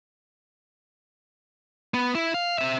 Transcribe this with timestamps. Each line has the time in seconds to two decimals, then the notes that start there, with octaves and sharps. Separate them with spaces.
1.94 B3
2.15 E4
2.34 F5
2.58 C4 E5